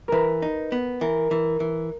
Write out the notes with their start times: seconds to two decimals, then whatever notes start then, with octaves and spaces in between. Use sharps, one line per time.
0.08 E3 A#4 B4
0.42 D#4
0.72 B3
1.01 E3 A#4
1.31 E3
1.60 E3